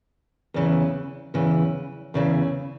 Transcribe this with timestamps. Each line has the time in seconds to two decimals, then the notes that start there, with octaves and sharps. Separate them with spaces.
0.54 E2 C#3 E3
1.34 E2 C#3 E3
2.14 E2 C#3 E3